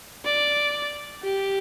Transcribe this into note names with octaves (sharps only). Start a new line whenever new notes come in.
D5
G4